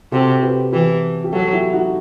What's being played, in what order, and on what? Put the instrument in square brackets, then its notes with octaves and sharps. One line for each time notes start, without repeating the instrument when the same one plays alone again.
[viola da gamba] C3 [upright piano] F#4 A4
[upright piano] G4 B4
[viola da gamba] E3 [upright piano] G4 B4
[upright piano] G4
[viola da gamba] F#3 [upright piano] F#4 A4
[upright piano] E4 G4
D#4 F#4